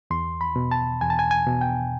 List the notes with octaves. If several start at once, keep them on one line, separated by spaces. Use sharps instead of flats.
E2 C6
B5
B2
A5
E2 G#5
A5
G#5
G#5
B2
G5